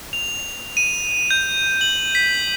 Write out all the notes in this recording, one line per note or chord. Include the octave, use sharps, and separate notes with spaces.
F7
D#7
G6
F#7
B6